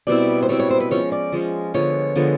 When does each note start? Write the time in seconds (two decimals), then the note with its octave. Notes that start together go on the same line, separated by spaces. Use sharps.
0.07 B2 G3 C4 E4 D5
0.42 C5
0.49 B2 G3 C4 E4 C#5
0.59 C#5
0.70 C5
0.80 B4
0.91 F3 G#3 C#4 C#5
1.12 D5
1.32 F3 G#3 C#4
1.74 D3 F3 G#3 B3 C#5
2.16 D3 F3 G#3 B3